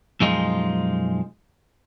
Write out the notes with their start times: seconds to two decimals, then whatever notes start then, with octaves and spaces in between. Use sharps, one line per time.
0.20 B1 F#2 F3 G#3 D#4 F4